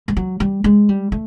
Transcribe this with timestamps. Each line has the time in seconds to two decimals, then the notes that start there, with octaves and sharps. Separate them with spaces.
0.08 G3
0.17 F#3
0.40 G3
0.64 G#3
0.89 G3
1.12 A3